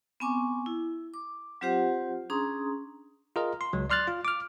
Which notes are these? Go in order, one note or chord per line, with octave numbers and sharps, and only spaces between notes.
B3 C4 G#5 C#6 D6
E4
D6
F#3 C4 F4 G4 C5 F#5
C#4 D4 G#4 A#5 C6 D#6
F4 G#4 A#4 D#5
C6
C#2 F#3
D5 C6 F6 F#6 A6
F4
D6 F6